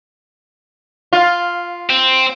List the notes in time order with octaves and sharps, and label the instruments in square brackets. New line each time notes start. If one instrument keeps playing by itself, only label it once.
[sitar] F4
[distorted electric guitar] C4